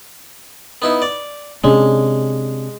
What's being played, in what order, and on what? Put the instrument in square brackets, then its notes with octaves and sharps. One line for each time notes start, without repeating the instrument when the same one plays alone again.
[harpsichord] B3 D#4 E4
D5
[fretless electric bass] C3 C#4 D4 [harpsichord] G#3